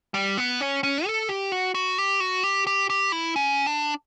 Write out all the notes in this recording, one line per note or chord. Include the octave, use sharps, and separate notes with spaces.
G3
B3
C#4
C#4
A4
G4
F#4
F#4
G4
F#4
G4
G4
G4
E4
C#4
D4